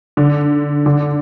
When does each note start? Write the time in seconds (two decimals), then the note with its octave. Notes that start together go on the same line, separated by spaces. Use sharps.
0.17 D3
0.86 D3